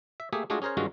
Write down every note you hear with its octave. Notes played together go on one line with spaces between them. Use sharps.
E5
A3 A#3 G4 G#4 E5
G#3 A3 D4 F4 F#4 G#4
C#4 G#4 A#4 C5 C#5
G2 D#3 G#3 C#4 F4 F#4